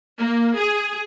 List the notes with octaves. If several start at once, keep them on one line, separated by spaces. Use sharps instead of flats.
A#3
G#4